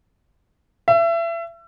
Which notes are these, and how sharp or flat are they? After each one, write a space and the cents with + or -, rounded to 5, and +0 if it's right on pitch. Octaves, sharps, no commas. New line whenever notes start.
E5 +30